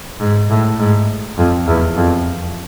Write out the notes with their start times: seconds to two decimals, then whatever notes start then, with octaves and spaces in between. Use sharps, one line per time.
0.20 G#2
0.49 A2
0.79 G#2
1.37 F2
1.67 E2
1.96 F2